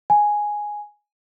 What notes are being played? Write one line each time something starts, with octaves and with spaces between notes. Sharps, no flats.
G#5